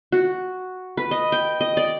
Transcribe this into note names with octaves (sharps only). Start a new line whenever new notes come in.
F#4
B4
D#5
G5
D#5
D5